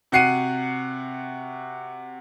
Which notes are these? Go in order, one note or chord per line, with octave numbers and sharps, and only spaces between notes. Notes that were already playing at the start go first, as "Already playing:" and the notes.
C3 F#4 F#5 C7 C#7 D#7